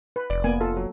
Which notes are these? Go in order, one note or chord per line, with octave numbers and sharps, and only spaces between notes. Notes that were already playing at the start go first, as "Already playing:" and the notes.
B4
F1 D5
A#3 B3 G#5
F4 A4
F#3